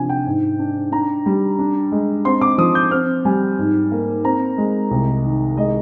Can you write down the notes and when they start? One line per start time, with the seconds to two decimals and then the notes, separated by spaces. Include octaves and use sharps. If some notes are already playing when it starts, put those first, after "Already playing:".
Already playing: C3 F3 D4 G#5
0.09 G5
0.26 G#2
0.59 D4
0.92 D4 A#5
1.26 G3
1.59 D4
1.92 G#3
2.25 C4 C6
2.41 D6
2.58 F3 D#6
2.75 G6
2.91 C4 F6
3.25 G3 G#5
3.58 G#2
3.92 A#3
4.24 C4 A#5
4.58 G#3
4.91 C2
5.24 D#3
5.57 G#3 D#5